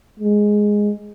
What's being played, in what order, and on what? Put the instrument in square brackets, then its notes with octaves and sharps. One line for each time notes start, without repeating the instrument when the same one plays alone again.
[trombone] G#3